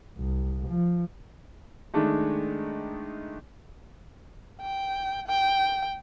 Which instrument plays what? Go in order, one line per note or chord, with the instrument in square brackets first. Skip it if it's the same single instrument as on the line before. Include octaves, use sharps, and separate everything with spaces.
[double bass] C2
F3
[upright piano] D#3 G#3 A3 D4 D#4
[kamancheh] G5
G5